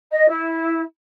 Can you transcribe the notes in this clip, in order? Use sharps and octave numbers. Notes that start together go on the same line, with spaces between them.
D#5
E4